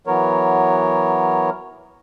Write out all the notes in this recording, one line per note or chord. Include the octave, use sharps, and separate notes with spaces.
E3 F#3 B3 A#4 C#5